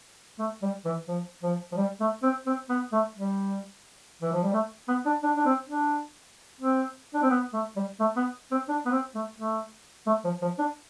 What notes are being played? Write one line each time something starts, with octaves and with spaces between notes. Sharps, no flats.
A3
G3
E3
F3
F3
F3
G3
A3
C4
C4
B3
A3
G3
E3
F3
G3
A3
B3
D4
D4
D4
C4
D4
C4
D4
C4
B3
A3
G3
A3
B3
C4
D4
B3
C4
A3
A3
A3
F3
F3
D4